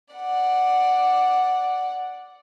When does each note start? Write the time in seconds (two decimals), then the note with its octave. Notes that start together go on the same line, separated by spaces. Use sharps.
0.14 D5 F#5